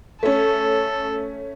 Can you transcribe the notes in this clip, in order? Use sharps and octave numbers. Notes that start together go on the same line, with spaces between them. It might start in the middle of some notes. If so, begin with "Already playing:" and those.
A3 C#4 A4